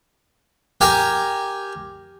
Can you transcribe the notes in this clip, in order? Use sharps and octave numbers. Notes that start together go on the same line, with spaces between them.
G4 A#4 G#5